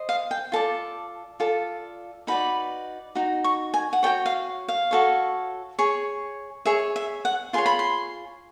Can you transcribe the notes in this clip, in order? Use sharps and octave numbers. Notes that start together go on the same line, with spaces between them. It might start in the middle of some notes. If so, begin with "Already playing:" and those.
Already playing: C5 D#5
F5
G5
F4 A4 D5 A5
F4 A4 D5
D#4 F#4 B4 D5 B5
D#4 F#4
C#6
G#5
F#5
F#4 A4 C#5 G5
F5
F5
F#4 A4 C#5
G#4 C#5
G#4 C#5 E5
E5
F#5
F4 G#4 C#5 C6
B5
C6